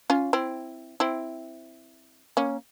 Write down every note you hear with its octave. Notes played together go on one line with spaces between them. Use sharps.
C#4 F4
C4 E4
C4 E4
A#3 C#4